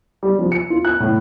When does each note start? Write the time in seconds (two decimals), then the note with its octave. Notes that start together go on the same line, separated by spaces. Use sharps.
0.23 G3
0.39 F3
0.52 C#7
0.70 F4
0.85 F#6
1.00 A2